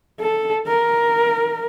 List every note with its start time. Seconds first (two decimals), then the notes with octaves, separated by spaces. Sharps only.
0.20 A4
0.67 A#4